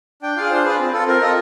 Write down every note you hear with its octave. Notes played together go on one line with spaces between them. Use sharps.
D4 G5
F4 G#4 F5
D4 C5
F4 G#4 B4
C4
F4 A4
C4 A#4
F4 A4 D#5